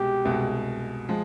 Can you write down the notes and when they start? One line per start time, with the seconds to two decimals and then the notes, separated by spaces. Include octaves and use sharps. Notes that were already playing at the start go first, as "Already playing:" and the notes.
Already playing: C2 B2 G#3 G4
0.25 C2 B2 G#3
1.09 F3 G#3